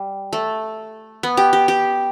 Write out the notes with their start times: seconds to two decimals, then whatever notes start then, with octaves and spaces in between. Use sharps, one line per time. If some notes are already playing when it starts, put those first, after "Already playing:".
Already playing: G3
0.33 A3
1.23 B3
1.37 G4
1.53 G4
1.68 G4